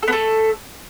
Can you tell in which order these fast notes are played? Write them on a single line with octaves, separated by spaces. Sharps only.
A4 B3 A3